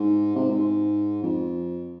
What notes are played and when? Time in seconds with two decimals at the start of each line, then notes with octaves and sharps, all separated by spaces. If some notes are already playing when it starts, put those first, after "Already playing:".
Already playing: G#2
0.35 C3
0.50 G#2
1.23 F2